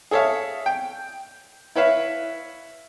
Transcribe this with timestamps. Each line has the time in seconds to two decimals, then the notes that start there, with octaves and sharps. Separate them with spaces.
0.11 G#4 A4 C#5 E5 F5
0.66 G5
1.75 E4 B4 C#5 E5 F5